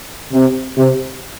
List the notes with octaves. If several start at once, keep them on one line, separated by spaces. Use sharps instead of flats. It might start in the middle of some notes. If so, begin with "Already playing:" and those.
C3
C3